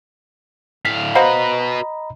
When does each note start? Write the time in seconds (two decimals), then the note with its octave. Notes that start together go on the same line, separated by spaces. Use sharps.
0.85 A2 F5 B6
1.15 F#4 B4 C5 D#5 F5 F#5 A#5 B5